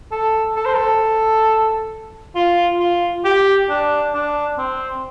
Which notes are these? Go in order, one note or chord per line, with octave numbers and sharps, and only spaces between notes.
A4
A4
C5
A4
F4
F4
G4
D4
D4
C4